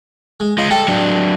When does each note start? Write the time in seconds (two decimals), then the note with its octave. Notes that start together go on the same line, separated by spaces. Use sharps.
0.40 G#3
0.58 G#3 F4 D#5
0.71 G3 A4 D#5 G5
0.88 F#3 D4